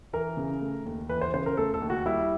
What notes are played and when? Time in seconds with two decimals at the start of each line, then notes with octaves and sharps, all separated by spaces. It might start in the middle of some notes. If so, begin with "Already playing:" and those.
0.13 E3 A#4
0.37 C#3
0.61 A3
0.86 D#2
1.09 E3 B4
1.21 C5
1.33 C#3 C5
1.46 A#4
1.57 A3 A4
1.74 A4
1.81 D#2
1.90 F#4
2.06 G3 E4